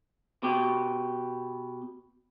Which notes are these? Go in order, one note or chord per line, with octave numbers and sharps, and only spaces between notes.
B2 G4